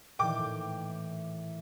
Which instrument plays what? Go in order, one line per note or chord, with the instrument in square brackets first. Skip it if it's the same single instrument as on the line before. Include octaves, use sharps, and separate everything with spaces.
[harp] A#2 D#3 E3 [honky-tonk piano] G5 D6
[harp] A2